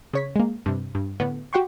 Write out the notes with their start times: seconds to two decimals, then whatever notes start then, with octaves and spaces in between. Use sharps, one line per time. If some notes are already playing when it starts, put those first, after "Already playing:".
0.13 C#3 C#5 B6
0.36 G#3 A#3
0.66 G2 C3
0.95 G2
1.20 A2 D3 B3
1.53 F#4 G4 F#5 G5 C6 C#6